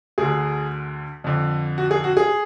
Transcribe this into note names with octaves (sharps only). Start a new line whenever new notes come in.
D2 D3 G#4
F2 D3
F#4
G#4
F#4
G#4